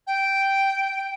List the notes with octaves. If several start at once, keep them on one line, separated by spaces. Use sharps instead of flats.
G5